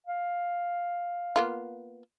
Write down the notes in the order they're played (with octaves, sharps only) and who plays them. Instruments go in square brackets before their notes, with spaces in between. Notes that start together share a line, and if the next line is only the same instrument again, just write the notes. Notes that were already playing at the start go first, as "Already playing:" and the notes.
[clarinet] F5
[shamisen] A#3 B3 F4